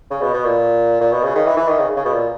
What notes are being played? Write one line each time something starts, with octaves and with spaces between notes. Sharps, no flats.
C#3
B2
B2
A#2
A#2
B2
C#3
D#3
E3
E3
D#3
C#3
C#3
B2
A#2